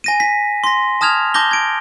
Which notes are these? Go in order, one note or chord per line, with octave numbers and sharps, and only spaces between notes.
G#5 A#6 D#7
B6
C6 A#6
A5 D#6 F6 G#6 F7
A5 D6 G6 A#6 G7
G#6 D7